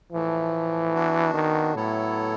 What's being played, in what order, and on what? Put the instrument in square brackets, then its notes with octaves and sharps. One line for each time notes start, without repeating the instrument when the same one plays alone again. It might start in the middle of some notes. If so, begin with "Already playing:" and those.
[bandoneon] A2 F3 A3 [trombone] E3
[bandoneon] B3 D4 F#4
[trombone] D#3
[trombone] A2 [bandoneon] F#3 B3 E4 A4 C#5